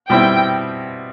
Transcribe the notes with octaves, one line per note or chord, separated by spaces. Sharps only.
B2 G3 C4 E4 G5